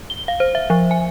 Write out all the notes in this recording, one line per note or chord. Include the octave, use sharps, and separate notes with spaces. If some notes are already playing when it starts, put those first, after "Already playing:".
G7
F5
C5
E5
F3
G#5